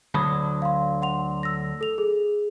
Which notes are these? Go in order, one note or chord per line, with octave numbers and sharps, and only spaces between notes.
D2 D3 F#3 B5 D#6
F5 C6
F#5 C6 F7
E6 A#6
A4 F7
G#4